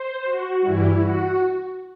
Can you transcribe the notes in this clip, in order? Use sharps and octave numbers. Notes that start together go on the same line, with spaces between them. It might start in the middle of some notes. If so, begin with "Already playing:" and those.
Already playing: C5
F#4
G2 E3 G3 E4
F#4